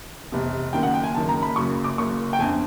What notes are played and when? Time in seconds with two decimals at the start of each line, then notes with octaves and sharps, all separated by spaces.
0.32 F1 E2 C3
0.73 F#1 F#2 D#3 G5
0.83 F#5
0.94 G5
1.04 G#5
1.15 F#1 F#2 D#3 A5
1.29 A#5
1.42 B5
1.55 F#1 F#2 C#3 C#6
1.84 D6
1.98 F#1 F#2 C#3 C#6
2.33 G5
2.39 G1 F2 D3 G#5